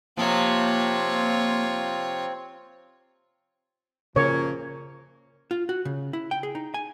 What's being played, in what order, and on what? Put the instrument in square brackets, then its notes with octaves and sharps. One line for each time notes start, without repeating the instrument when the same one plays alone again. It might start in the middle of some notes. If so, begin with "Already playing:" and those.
[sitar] C3 F3 [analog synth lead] A#3 [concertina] C4 [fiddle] F4 C#5
[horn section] A#2 F3 A#3 [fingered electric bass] C#3 [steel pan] C#5
[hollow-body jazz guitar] F4
F#4
C#3
E4
G5
G#4
D#4
G#5